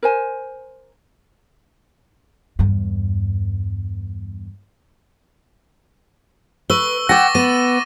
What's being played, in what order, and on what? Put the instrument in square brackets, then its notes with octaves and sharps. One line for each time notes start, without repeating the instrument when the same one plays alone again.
[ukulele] A#4 C5 G#5
[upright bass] E2 G2
[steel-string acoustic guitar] B4 [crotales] C#6 E6 G7
[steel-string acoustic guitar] F#5 G5 [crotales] D6 A6 A#6
[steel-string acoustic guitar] B3 [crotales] D#7